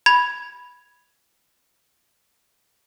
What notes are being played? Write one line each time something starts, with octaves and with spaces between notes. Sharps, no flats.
B5 G#6 F7